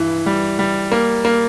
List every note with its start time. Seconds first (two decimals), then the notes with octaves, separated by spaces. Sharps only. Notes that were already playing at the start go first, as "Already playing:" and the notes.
Already playing: G2 E3
0.26 G3
0.59 G3
0.92 A#3
1.25 A#3